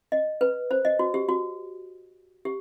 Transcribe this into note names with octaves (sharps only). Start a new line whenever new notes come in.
D#5
B4
C5
D#5
F#4
G4
F#4
G4